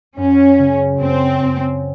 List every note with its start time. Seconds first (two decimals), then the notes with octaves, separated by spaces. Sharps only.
0.17 F#2 C#4
0.58 C#3
1.00 F#2 C4
1.43 F#2